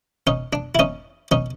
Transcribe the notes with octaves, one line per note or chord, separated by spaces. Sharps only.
C#4 D#4
D4
E4
C#4 D#4
C#4 D#4